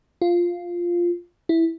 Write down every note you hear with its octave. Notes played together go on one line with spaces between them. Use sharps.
F4
E4